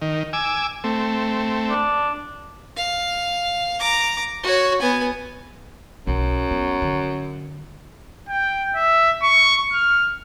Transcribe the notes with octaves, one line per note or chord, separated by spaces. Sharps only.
D#3
G#5 D6 E6
A3 C4
D4
F5
A#5 D6
F#4 C#5
B3 G#5
B1 F#2
B3
D3
G5
E5
C#6
F6